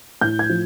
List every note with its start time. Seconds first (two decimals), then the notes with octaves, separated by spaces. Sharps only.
0.21 A2 G6
0.39 G#6
0.49 F3